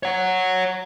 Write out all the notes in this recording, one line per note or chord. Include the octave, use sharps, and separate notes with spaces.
C#5 F#5